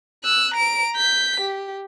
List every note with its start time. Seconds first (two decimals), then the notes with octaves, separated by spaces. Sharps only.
0.24 E6 F#6
0.54 A#5 D7
0.97 G6 B6
1.40 G4